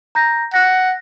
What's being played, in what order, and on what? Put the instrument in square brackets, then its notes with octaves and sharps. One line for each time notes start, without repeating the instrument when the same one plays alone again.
[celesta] A#5 G6 A#6
[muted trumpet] F#5 [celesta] A#6